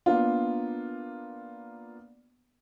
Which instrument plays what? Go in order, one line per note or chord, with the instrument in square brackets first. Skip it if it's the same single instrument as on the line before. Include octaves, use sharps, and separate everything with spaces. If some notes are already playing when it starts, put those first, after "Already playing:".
[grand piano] A#3 B3 D4 F4